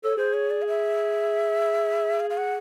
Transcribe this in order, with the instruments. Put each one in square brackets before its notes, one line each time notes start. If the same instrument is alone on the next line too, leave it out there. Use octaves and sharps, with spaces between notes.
[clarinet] A4 [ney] C#5
[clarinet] G#4 [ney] C5
[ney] C#5
D5
F5
E5
F5
F5
F#5